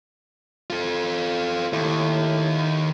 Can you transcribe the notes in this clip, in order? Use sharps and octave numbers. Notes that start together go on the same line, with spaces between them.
F4 A4
D#2 A2